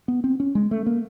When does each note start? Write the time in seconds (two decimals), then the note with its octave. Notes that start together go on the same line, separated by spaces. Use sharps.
0.08 B3
0.24 C4
0.40 C#4
0.55 G#3
0.71 A3
0.86 A#3